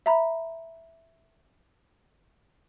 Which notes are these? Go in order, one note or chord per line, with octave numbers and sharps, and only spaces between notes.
E5 A#5 B5